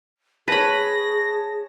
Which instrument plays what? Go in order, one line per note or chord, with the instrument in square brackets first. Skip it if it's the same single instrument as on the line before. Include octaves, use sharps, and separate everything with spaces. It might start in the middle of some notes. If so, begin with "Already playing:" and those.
[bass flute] G#4 [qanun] B4 B5 [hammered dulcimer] C#5 A5 [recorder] A#6